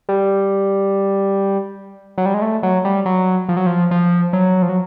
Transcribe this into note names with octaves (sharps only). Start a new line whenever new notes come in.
G3
F#3
G3
G#3
A3
F#3
G3
F#3
F3
F#3
F3
F3
F#3
F3
F#3